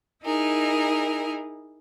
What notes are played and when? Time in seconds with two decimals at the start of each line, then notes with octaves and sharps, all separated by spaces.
0.23 D#4 E4 G#4 A#4